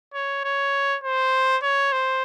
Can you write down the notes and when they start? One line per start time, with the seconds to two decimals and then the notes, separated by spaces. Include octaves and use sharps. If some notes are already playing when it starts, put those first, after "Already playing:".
0.14 C#5
0.44 C#5
1.04 C5
1.62 C#5
1.92 C5